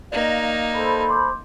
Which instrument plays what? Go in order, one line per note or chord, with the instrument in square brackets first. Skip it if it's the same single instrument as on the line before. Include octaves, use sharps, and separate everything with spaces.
[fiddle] A#3 D#4 [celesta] D5 [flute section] D#5 F5
[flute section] A4 C5 B5
[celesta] C6 D6 G6